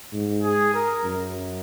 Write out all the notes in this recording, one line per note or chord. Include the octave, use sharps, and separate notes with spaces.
G#2
G#4
A#4
F#2